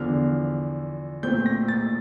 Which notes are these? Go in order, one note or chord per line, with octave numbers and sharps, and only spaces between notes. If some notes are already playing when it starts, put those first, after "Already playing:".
Already playing: E2 D3 F3 F6
A#2 A3 C4 G6
A#6
A6